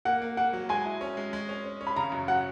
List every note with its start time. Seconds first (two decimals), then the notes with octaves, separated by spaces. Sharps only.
0.05 A#3 F#5
0.22 A#3
0.37 A#3 F#5
0.53 F#3
0.69 G#3 G#5
0.85 E4
1.01 C#4
1.17 G#3
1.33 G#3
1.49 C#4
1.65 C#4
1.81 C#4
1.87 B5
1.96 C#3 A#5
2.12 F#2
2.28 F#3 F#5